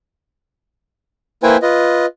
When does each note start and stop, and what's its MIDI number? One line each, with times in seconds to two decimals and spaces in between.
1.43 1.57 58
1.43 1.57 64
1.43 1.57 71
1.43 1.57 72
1.43 1.57 79
1.43 1.57 80
1.62 2.06 65
1.62 2.06 71
1.62 2.06 75